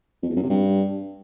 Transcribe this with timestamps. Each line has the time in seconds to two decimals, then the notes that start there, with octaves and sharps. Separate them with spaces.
0.22 F2
0.29 E2
0.36 F#2
0.43 C3
0.50 G2